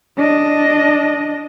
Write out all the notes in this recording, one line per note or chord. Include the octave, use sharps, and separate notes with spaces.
D4 D#5